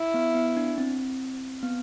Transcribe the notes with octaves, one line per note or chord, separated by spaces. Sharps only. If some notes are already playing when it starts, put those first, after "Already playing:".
Already playing: E4
B3
B3
D4
C4
B3